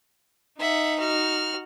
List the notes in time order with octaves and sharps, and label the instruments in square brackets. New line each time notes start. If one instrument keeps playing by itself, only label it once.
[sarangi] D#4 [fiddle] E5 F#5
[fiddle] F#4 F6